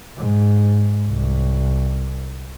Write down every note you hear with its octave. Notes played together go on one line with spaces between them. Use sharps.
G#2
C2